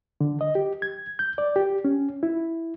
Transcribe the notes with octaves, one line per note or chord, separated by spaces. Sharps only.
D3
D#5
G4
G#6
G6
D5
G4
C#4
E4